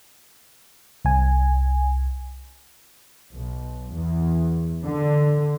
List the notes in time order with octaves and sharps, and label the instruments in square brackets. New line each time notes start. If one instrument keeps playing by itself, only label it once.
[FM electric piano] C2 G#5
[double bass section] B1
E2
D3